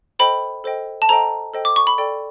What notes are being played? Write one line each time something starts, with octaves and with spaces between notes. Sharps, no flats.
A4 C5 D#5 G5 B5
A4 C5 D#5 G5
A5
A4 C5 D#5 G5 A#5
A4 C5 D#5 G5
D6
C#6
B5
A4 D5 G5